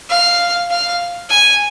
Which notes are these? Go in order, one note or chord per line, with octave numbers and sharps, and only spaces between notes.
F5
F5
G#5